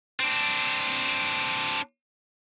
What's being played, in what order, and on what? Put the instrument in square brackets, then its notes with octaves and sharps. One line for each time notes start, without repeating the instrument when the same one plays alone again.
[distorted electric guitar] C4 D4